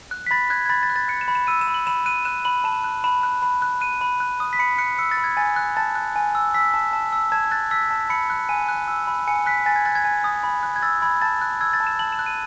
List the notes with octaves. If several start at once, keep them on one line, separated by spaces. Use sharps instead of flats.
F#6
B6
B5 A6
F#6 G#6
G#6
B5 A6
A6
F#6
A6
F#6 C#7
E7
B5
E7
E6 D#7
E7
B5
F#7
B5 E7
F#6 D#7
F#6 E7
B5 F#7
A5 E7
F#6
B5 E7
F#6
B5
F#6
F#6 D#7
B5
F#6
D#6
B6
B5 C#7
F#6 C#7
E6 C#7
A6
B5
G#6
G#5 A6
F#6
A5 A6
F#6
G#5
E6
E6 B6
A5
A5
E6
A5 G#6
F#6 A6
E6 B6
A5
B5 C#7
F#6
G#5 D#7
F#6
E6
B5
G#5 C#7
F#6 B6
G#5 A6
G#6
F#6 A6
G#6
G#5
D#6
B5
F#6
G#6
E6 A6
B5 G#6
A5 A6
F#6
E6 G#6
A6
A5
E7
A5 F#7
E7
F#6
D#7